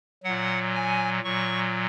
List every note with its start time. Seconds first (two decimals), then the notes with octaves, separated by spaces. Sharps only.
0.23 A#2 F#3 F#5
0.74 G#5
1.23 A#2 F#3 C#6